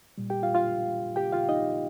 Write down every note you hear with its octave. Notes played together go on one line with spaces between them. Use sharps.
A#2 G3
G4 G5
F4 F5
F4 F5
G4 G5
F4 F5
D#4 D#5